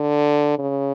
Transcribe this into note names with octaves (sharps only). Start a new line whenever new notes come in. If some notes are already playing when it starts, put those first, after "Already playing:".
Already playing: D3
C#3